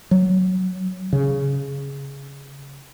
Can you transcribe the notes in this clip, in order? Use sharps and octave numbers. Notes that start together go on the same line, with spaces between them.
F#3
C#3